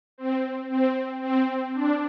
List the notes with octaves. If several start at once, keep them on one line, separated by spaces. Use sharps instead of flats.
C4
C4
C4
D4